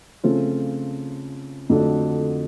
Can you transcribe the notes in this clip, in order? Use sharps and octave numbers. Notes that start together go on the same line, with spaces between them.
C#3 F3 A3 C4 F4
F2 D3 F#3 A3 D4